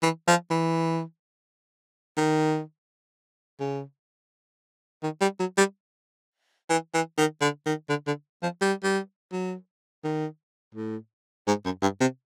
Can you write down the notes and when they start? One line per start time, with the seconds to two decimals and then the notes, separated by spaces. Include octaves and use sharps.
0.03 E3
0.27 F3
0.50 E3
2.17 D#3
3.60 C#3
5.03 D#3
5.21 G3
5.40 F#3
5.58 G3
6.70 E3
6.94 E3
7.18 D#3
7.41 D3
7.66 D#3
7.89 D3
8.07 D3
8.43 F3
8.61 G3
8.84 G3
9.32 F#3
10.04 D#3
10.75 A2
11.47 G#2
11.65 F#2
11.82 G2
12.00 C3